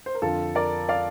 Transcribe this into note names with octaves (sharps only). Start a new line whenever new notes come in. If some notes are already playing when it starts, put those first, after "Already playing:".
C5
A#4
F2 D3 F4 A4
A#4 D5
D5 F5